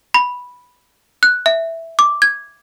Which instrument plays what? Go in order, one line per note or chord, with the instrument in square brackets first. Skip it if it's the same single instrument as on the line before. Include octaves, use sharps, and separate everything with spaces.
[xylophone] B5
F#6
E5
D6
G#6